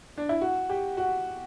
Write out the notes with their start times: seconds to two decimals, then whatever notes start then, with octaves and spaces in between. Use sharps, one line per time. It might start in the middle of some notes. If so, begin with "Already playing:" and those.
0.18 D4
0.29 E4
0.41 F#4
0.69 G4
0.97 F#4